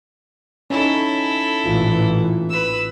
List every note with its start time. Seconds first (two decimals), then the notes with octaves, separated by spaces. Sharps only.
0.70 C#4 D#4 E4 A4
1.65 A1 A#2 E3 F4
2.49 B4 E6